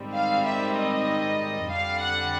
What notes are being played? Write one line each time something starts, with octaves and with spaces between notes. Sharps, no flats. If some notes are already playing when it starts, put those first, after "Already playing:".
Already playing: G#2 D#3 G3 C4
F5
E5
D#5
F2 D3 G3 F5
F#5